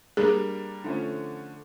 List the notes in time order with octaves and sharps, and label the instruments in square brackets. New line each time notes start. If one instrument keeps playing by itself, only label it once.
[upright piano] G3 A#3 D4 [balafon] G#4
[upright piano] D3 F3 A3 C#4